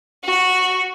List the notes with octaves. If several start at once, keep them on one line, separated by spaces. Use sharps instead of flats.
F#4